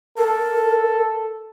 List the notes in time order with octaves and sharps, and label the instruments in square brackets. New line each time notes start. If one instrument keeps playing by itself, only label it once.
[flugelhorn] A4 [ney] A#4